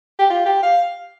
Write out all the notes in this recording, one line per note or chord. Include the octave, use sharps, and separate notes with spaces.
G4
F4
G4
F5